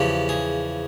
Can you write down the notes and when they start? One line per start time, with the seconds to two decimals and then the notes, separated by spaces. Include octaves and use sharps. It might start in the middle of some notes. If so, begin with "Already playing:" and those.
Already playing: E2 C#3 F3 G4
0.29 G#4